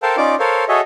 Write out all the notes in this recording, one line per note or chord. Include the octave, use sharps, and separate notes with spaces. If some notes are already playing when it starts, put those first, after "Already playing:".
A4 A#4 C5 F5 G5 A5
C#4 D#4 F4 D5 D6
A4 A#4 C5 C#5 F5
F#4 G#4 A4 C#5 D#5 E5